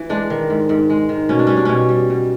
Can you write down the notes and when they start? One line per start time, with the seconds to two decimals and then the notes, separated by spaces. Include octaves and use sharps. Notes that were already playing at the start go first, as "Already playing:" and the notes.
Already playing: E3
0.10 G#3 D4
0.30 D#3
0.50 G#2
0.69 G#2
0.90 G#3
1.09 D#3
1.29 B2 C#4
1.39 D4
1.47 G3 C#4
1.57 D4
1.65 B2 C#4
1.89 G3
2.10 B2